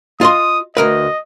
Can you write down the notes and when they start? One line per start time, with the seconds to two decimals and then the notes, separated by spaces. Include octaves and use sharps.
0.21 F4 D#5 C6 D#6
0.77 D2 A#4 B4 D#5